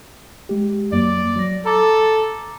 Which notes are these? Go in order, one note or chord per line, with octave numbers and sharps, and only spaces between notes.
G#3 G4
F#2 F#3 A#3 D5
F#3 A#6
A4 A#5 D6 A6